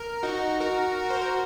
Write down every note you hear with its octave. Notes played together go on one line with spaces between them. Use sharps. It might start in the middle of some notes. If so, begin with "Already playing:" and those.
Already playing: A#4
D#4 F#4
F#4 A#4
C5
A#4